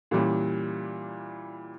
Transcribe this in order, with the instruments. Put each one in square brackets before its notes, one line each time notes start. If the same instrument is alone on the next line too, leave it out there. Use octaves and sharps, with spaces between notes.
[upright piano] A#2 E3 G3 C#4